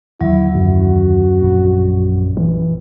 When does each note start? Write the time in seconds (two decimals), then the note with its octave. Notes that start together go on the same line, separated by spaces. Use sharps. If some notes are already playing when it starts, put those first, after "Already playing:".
0.21 D#2 D3 F3 F#3 E4
0.55 F#2 F#4
1.42 A#1 G2
2.37 E3